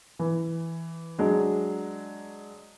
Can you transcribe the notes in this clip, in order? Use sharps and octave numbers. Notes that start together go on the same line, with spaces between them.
E3
F#3 G#3 D4